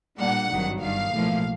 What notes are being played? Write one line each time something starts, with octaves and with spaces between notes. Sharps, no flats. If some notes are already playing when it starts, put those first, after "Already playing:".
A#2 G3 A#3 D4 F#5
G#1 G2 D#3 F#3
G1 G2 D#3 F5
B1 A2 F3 A#3